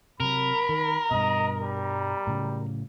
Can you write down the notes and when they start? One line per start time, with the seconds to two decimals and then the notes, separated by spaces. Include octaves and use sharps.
0.20 C3 F#3 A#4 B5
0.69 D#3
1.11 G2 B2 D#5
1.61 G3
2.27 A2 C#3 F#3